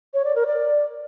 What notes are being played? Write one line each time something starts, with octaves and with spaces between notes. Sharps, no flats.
C#5
D5
A#4
D5